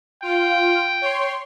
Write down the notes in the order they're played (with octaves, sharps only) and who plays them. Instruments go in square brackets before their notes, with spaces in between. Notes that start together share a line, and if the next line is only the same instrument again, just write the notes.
[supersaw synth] F4 [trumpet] G5
[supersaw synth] C#5 C6